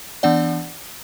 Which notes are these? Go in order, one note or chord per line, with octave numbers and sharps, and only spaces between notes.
E3 B3 D4 D5 F#5